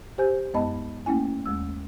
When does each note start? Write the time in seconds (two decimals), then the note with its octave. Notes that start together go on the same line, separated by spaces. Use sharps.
0.18 G4 C5 G#5 G6
0.54 F#2 G#3 B3 D#5 A5 B5
1.06 A3 A#3 C#4 E4 G#5
1.46 D#2 G#3 E6